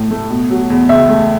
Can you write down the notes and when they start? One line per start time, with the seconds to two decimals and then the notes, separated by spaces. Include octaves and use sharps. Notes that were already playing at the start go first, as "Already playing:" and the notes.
Already playing: A2 A3
0.11 A3
0.30 B2
0.51 F#3
0.70 E2
0.89 C#2 E5
1.09 A3